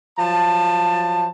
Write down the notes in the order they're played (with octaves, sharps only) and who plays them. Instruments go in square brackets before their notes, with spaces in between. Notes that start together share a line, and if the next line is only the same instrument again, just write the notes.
[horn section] F3 F#3 A5